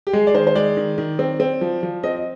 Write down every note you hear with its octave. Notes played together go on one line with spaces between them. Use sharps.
G4
G#3 G#4
D5
D#3 C5
C5
G#3 D5
D#3
D#3
C4
C4
F3
F3
C4 D#5
D#5